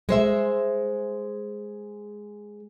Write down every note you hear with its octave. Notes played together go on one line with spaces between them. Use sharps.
G#3 C5 E5